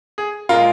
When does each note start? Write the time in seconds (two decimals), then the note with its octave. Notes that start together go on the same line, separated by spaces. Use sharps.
0.18 G#4
0.49 A#2 G#3 F4 A#4